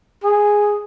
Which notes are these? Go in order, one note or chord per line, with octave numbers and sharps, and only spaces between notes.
G#4